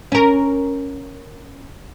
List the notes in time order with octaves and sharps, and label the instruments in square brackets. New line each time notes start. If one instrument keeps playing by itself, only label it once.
[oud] C#4 A#4